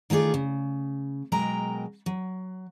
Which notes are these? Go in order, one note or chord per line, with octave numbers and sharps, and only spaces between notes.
D#3 A3 F4 G#4 D5
C#3
B2 F#3 G#3 A#4 G5 A#5
F#3